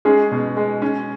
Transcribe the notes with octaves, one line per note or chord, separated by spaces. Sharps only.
G#3 C#4 G#4
B2
G#3
C#4